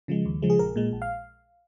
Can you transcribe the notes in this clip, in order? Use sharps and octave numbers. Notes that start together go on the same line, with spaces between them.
C#3 F3 G#3
D#2
C#3 F3 G#3
G#4
A#1 A#4
A#2 G#3
A#1
F5